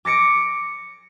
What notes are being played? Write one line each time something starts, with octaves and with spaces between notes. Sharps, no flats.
D6 A#6 C#7 D7